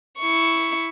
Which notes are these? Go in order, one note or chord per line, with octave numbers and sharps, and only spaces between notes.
E4 C#6